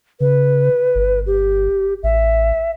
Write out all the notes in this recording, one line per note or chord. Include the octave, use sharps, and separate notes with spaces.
C#3 B4
G1
G4
A1 E5